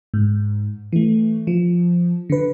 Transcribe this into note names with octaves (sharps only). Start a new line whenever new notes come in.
G#2
E3 A3
F3
D3 B4